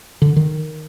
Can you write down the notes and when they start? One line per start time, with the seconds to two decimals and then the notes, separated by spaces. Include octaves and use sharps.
0.22 D3
0.36 D#3